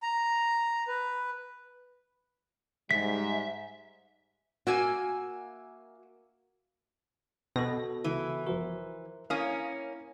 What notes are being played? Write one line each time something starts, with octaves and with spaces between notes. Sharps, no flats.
A#5
B4
G#2 G3 G#3 E5 B6
A#3 F#4 E5 G#5
B2 B3 F#4 A4 A#6
C#2 E3
G1 F3 F#4 A#4 C5
A#3 C#4 E4 F5 D#6